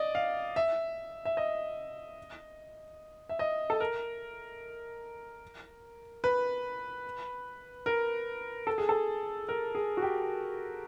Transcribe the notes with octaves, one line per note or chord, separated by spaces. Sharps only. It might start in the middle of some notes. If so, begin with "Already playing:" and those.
Already playing: D5 D#5
F5
E5
E5
D#5
E5
D#5
A4
A#4
B4
A#4
A4
G#4
A4
A#4
G#4
F#4
G4